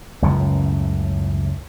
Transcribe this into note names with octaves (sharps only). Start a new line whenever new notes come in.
C#2 F#2 A2 C#3